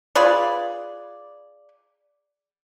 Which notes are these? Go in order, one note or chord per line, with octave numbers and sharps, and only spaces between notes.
F4 G#4 B4 D5